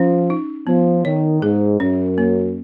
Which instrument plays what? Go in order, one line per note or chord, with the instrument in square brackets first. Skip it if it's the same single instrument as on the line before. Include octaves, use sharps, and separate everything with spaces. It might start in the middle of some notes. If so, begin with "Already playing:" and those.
Already playing: [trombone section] F3 [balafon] C#4
[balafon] D#4
[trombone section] F3 [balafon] B3
[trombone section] D#3 [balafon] C#5
[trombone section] G#2 [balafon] G#4
[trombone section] F#2 [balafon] C#4
[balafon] A#3